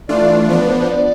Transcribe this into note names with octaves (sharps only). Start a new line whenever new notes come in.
E3 A3 D4 F4 D5
F3 B3 D4 C5
B4
C5
C5
D5